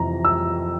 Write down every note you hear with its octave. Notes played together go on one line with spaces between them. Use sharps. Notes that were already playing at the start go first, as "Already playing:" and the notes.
Already playing: F2 C3 E3 A#5
E6